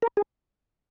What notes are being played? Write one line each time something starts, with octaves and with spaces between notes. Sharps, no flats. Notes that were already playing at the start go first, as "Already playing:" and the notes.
A#4
G#4